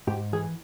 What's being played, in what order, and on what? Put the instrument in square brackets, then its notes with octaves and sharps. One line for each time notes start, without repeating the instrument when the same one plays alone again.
[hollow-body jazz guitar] G#2 G4
E3 G#4